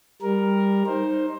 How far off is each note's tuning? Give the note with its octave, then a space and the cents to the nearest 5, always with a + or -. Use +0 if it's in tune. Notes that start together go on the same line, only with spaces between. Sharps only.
G3 +15 A#4 +5
D#4 +0 C5 +15